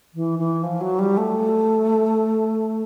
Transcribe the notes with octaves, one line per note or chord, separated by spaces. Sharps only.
E3
E3
F3
F#3
G3
A3